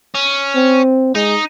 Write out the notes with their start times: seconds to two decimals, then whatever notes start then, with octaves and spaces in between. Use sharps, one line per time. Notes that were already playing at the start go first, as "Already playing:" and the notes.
0.15 C#4
0.56 C4
1.15 G#3 D#4